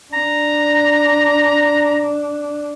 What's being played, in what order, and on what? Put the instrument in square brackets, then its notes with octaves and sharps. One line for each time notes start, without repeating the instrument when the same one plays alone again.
[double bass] D4 [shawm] A#5